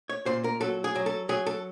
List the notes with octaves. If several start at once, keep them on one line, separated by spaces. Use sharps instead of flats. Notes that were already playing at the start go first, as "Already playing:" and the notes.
C#5
A#2 C5
A#4
F#3 A4
G#4
F#3
A4
F#3 G#4
A4